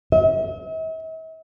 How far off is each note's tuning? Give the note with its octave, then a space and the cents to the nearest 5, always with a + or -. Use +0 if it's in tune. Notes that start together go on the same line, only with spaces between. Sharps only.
E5 -45